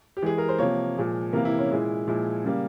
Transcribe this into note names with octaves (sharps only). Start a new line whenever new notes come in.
G4
E3 G#3 G#4
A#4
C5
C3 F3 A#3 C#5
A#2 F3 G#3
C3 E3 A#3 A#4
E4
C#4
A#2 G#3 E4
A#2 F3 G#3 E4
C#3 G3 A#3